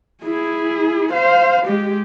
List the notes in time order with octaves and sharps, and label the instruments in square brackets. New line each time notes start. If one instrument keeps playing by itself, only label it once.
[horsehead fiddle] E4 G#4
C5 F5
G#3 G4